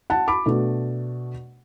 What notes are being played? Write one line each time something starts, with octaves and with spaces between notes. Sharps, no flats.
F#5 A5
B5 D6
B2 A3 D4